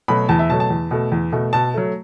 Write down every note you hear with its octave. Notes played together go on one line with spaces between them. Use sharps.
B2 F#3 A3 B5
E2 A5
E5
B2 F#3 A3 A5
A5
E2
B2 A3
E2
B2 A3
B2 A5
F#3 A3